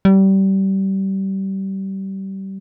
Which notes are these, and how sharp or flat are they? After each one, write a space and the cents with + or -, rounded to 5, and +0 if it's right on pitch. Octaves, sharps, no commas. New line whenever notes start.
G3 -25